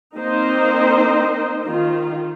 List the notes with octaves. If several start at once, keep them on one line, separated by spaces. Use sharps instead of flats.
A#3 C4 D#4 A#4 C5 D#5
D#3 F4